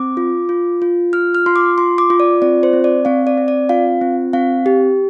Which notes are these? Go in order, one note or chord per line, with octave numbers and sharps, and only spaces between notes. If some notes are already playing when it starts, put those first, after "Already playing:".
Already playing: C4 D6
F4
F4
F4
F4 F6
F6
F4 C6
D6
F4 C6
D6
F4
D5
C4 D5
C5
C4
D5
C4 F5
D5
C4
D5
F4 F5
C4
C4 F5
G4